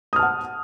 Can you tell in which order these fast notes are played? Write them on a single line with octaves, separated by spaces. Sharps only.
D#6 F6 A5 F#5